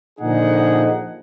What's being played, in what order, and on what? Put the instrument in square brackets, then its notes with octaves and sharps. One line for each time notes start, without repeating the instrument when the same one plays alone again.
[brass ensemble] A#2 D3 F3 D#4 G#4 F#5